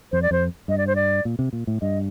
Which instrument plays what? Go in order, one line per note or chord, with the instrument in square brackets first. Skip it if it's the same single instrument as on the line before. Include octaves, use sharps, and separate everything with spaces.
[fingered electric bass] F2 [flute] C5
[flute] D5
[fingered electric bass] F2 [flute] C5
[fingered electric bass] G2 [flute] D#5
[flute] D5
C5
D5
[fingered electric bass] A#2
C3
A#2
A2
[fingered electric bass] G2 [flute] D#5